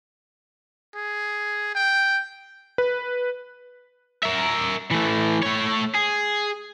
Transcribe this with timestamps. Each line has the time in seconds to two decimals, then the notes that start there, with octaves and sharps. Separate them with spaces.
0.95 G#4
1.74 G5
2.78 B4
4.23 A#4 E5
4.91 E3 A3
5.43 A3 C#5
5.95 G#4